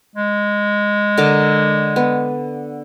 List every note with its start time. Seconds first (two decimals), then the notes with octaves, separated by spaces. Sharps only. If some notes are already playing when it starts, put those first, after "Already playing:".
0.16 G#3
1.17 D3 A#4 D6
1.96 B3